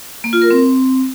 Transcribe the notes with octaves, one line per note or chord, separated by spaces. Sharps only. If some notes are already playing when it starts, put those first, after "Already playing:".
A#3
F4
A#4
C4